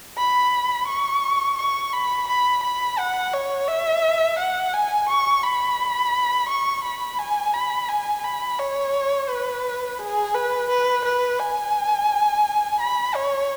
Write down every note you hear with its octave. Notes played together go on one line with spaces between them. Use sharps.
B5
C#6
C#6
B5
B5
B5
F#5
C#5
E5
F#5
G#5
C#6
B5
C#6
B5
G#5
B5
G#5
B5
C#5
B4
G#4
B4
B4
B4
G#5
B5
C#5